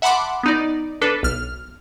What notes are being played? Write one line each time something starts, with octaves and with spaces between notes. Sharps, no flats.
E5 F#5 A5 B5 C6 D6
B3 D#4 D5
D4 A4 B4
B1 F6